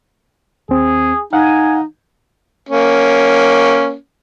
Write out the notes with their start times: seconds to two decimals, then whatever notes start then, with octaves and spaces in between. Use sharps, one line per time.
0.69 D#2 C4 G#4
1.33 D#4 F5 F#5 G#5
2.69 A#3 C#4